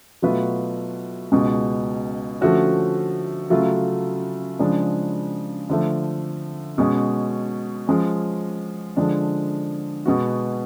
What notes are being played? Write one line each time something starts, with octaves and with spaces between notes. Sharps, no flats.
B2 F#3 A3 F4 B4
C#2 B2 G#3
D3 F3 A3 C#4 F#4
C#3 F#3 A3 F4 A4
C#3 F3 G#3 D4
D3 F3 A3
B2 G#3 C#4
F3 G#3 C#4
D3 F3 G#3 D4
B2 G#3 B3 F#4